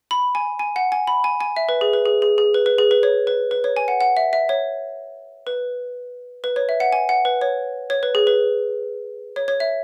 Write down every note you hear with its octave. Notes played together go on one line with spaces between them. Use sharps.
B5
G#5
G#5
F#5
G#5
B5
G#5
G#5
E5
B4
G#4
B4
G#4
G#4
G#4
B4
B4
G#4
B4
C#5
B4
B4
C#5
G#5
F#5
F#5
E5
E5
C#5
B4
B4
C#5
E5
F#5
G#5
F#5
B4
C#5
C#5
B4
G#4
B4
C#5
C#5
E5